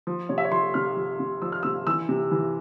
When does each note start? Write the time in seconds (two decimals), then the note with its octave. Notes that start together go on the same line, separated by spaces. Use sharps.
0.07 F3
0.29 C3 C#5
0.38 E5
0.45 C#5
0.52 F3 C6
0.74 C3 F6
0.96 F3
1.20 C3
1.42 F3 E6
1.52 F6
1.63 C3 E6
1.87 E3 E6
2.09 C3
2.31 E3